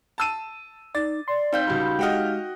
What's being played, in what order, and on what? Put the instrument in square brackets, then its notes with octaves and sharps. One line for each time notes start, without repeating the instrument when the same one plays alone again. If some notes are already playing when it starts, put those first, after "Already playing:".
[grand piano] A5 E6 D#7
[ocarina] D#4 [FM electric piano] D5 [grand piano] A6
[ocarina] D5 [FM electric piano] C6
[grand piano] C4 [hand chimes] D#4 F5 G6
[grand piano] C#2 G3 [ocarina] F#4
[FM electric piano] G#3 G4 F6 [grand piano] D#5 F#5 G5